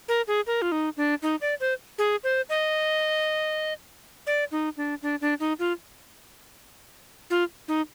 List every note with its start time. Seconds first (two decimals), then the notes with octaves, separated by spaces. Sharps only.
0.08 A#4
0.28 G#4
0.47 A#4
0.62 F4
0.72 D#4
0.97 D4
1.22 D#4
1.41 D5
1.60 C5
1.98 G#4
2.24 C5
2.49 D#5
4.27 D5
4.52 D#4
4.77 D4
5.02 D4
5.21 D4
5.40 D#4
5.59 F4
7.30 F4
7.68 D#4